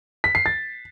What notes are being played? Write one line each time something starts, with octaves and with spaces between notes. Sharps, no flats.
B6
C7
A6